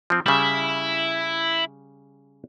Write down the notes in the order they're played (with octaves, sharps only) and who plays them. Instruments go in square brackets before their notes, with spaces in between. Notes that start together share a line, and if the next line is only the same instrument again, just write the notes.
[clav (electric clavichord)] F3 C4
[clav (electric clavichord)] C#3 G3 [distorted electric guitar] E4 E5